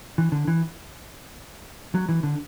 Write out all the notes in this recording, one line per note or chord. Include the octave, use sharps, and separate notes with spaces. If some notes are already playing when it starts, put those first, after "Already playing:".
E3
D3
E3
F#3
E3
D3